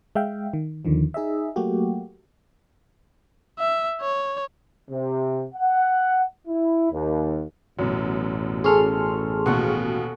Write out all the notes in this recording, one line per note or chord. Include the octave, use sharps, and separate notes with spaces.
G#3 E5 F5 G5
D#3
D#2 D3 D#3 F3
D#4 G#4 D#5 E5
F#3 A3 A#3 F#4 G4
E5
C#5
C3
F#5
E4
D#2
A1 F#2 B2
C#4 G#4 A4 C6 F6
D#2 B2 F#4 F#5 C#6